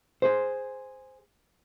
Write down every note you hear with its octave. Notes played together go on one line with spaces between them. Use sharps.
G#4 C5